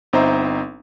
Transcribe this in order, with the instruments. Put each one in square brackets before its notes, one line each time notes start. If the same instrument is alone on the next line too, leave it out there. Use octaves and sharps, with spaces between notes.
[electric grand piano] G1 C4 D#4 C5 E5 A#5